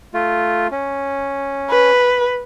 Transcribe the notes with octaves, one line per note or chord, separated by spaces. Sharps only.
A3 F4
C#4
B4